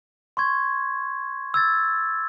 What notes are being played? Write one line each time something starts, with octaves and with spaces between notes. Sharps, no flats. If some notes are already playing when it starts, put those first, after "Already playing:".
C6 C#6 G#6
E6 G#6 A6